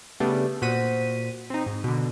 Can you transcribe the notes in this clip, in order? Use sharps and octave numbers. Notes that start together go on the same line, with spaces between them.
C#3 G3 A3 B3 D4
A#2 F#4 C5 B6 D#7
C4 D#4
G#2
B2 D3